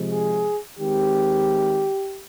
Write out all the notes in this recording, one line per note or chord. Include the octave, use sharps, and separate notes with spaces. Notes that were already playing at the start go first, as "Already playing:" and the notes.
Already playing: C3 F3 G#3
G#4
D#3 G#3 C4 G4